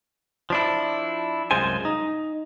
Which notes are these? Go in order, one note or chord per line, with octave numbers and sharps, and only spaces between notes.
F3 D4 E4
C2 F#2 G#3 F4 C5 G#5
D#4